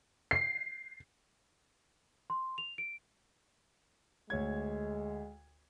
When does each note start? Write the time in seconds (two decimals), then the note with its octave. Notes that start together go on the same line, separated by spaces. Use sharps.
0.31 C7
2.30 C6
2.58 F7
2.78 D7
4.30 D2 G#3 C#5 G#6